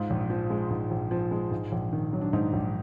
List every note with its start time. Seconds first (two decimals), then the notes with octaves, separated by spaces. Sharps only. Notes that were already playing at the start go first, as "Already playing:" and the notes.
Already playing: G#2 F4
0.10 A#1
0.30 F3
0.50 G#3
0.70 G#2
0.91 A#1
1.11 F3
1.31 G#3
1.51 G#2
1.72 A#1
1.93 D#3
2.13 F#3
2.21 D4
2.33 G#2 D#4
2.53 A#1